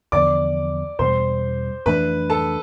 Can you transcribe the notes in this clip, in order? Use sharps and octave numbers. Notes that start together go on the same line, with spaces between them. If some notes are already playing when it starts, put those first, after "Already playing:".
E2 D3 F3 B3 D5 D6
E2 B2 G3 C5 C6
F2 E3 A3 D4 B4 B5
A4 A5